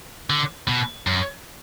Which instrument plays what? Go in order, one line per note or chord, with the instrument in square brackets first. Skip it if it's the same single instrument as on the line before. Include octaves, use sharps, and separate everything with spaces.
[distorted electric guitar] D3
B2
F#2